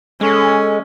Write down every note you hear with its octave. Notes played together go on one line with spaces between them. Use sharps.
G#3 C#4 A4